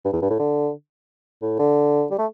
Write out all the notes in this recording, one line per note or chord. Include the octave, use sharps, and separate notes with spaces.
G2
E2
G2
A2
D3
A2
D3
G3
A3